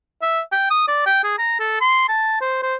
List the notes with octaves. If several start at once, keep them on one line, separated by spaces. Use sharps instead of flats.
E5
G5
D#6
D5
G5
G#4
A#5
A4
C6
A5
C5
C5